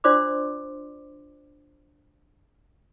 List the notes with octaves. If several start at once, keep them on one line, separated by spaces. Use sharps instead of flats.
D4 F4 C5 D5 C6 D6